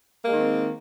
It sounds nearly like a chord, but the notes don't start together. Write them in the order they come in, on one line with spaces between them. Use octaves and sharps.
A#3 G#3 D#3 C4